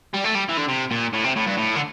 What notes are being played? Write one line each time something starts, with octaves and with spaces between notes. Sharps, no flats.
G3
A3
G3
E3
D3
C3
A#2
A2
C3
A2
G2
A2
D3